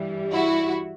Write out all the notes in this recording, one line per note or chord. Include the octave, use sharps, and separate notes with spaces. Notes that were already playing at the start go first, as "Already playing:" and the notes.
Already playing: G2 E3 G3
E4 F#4